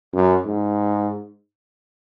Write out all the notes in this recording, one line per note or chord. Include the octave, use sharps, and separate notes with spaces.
F#2
G#2